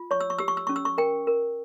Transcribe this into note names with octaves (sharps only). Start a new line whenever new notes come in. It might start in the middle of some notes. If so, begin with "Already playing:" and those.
Already playing: F4
C#5 C#6
E6
C#6
G4 E6
C#6
E6
C#4 C#6
E6
C#6
A#4 G5
A#4